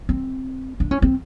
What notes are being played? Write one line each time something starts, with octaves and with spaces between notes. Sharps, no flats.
C4
D4
C#4
C4